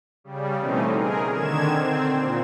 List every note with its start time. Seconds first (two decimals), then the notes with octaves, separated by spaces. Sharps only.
0.24 C#3 G3
0.59 B2 E3 A3 C4 C#4 D#4
0.91 G#4 A#4
1.31 D3 D#3 G#6 E7
1.70 C4
2.12 A#2